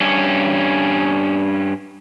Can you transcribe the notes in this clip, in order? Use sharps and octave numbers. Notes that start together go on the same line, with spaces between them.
G2 C#4